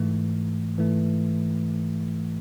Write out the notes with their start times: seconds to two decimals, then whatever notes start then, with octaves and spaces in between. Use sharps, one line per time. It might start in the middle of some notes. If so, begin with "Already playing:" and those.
Already playing: G#2 E3 A3
0.78 G#2 E3 A3